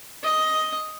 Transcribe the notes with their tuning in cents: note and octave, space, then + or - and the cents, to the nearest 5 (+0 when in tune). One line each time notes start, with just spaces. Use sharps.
D#5 +10